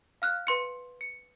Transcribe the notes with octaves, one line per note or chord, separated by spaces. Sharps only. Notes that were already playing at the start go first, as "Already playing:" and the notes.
F5 F6 F#6
B4 C6 C#7
C#7